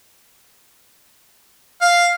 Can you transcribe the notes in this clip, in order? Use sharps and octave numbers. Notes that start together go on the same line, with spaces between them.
F5